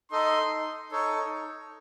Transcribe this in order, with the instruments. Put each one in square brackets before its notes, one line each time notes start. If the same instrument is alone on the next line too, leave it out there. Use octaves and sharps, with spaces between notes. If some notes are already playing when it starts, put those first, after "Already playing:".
[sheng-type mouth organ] D#4 A4 D#5 [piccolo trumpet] C6
[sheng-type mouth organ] D#4 A4 C#5